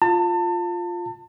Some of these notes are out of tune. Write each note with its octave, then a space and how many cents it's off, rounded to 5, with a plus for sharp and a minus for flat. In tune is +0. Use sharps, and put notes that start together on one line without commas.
F4 +0 A5 +30